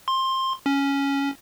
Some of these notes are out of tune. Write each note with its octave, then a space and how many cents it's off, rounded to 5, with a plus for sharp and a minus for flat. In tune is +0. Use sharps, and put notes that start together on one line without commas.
C6 +15
C#4 +5